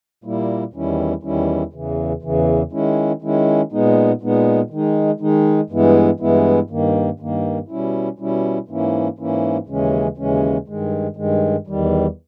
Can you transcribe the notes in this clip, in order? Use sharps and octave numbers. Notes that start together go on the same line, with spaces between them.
A#2 G3 A#3 E4
E2 D#3 G3 C#4 E4
E2 D#3 G3 C#4 E4
E2 C#3 E3
E2 C#3 E3
D#3 G#3 C#4 E4
D#3 G#3 C#4 E4
A#2 G#3 B3 D#4
A#2 G#3 B3 D#4
D#3 G#3 D#4
D#3 G#3 D#4
G2 E3 G#3 B3 E4
G2 E3 G#3 B3 E4
G2 D#3 A#3
G2 D#3 A#3
B2 G3 C#4 E4
B2 G3 C#4 E4
G#2 E3 A#3 C#4 E4
G#2 E3 A#3 C#4 E4
D#2 C#3 E3 G#3 C#4
D#2 C#3 E3 G#3 C#4
G2 D#3 G#3
G2 D#3 G#3
E2 D#3 G3